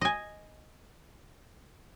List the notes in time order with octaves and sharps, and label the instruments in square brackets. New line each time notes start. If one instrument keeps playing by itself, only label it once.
[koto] D#5 G#5